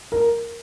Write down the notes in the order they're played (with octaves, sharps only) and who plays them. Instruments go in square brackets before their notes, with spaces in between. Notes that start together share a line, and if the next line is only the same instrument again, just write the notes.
[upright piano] A#4